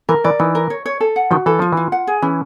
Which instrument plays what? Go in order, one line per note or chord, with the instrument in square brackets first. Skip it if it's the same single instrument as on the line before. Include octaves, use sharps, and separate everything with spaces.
[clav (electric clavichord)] E3 [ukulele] A#4
[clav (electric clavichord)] E3 [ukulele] D5
[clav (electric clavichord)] E3 [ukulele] D#4
[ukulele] A#4
C#5
C#5
A4
F#5
[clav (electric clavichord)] D#3 F3 [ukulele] F#4
[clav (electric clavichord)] E3 [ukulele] A4
[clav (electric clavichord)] F3 [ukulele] F4
[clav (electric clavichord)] E3 [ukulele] F4
[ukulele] F#5
G#4
[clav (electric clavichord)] E3 [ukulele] C#4